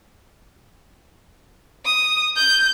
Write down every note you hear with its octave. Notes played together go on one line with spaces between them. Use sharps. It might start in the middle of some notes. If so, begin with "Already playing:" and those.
D#6
G6